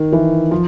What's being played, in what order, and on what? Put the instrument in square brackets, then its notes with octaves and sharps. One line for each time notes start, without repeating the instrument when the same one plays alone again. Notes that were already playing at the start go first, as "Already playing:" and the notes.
Already playing: [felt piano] D#3
E3
F3